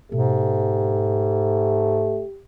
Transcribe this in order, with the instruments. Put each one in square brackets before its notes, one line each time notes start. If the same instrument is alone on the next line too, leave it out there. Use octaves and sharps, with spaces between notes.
[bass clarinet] G#2 [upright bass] B2 B3 [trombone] A3 [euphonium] G4